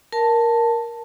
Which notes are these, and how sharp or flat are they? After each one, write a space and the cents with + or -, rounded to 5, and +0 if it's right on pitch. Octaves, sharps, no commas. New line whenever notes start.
A#4 +5 A5 +5